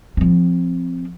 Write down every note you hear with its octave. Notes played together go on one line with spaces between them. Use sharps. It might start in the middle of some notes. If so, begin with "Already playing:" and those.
F3 C4